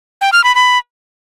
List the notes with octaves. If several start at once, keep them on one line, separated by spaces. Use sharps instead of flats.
G5
F6
B5
B5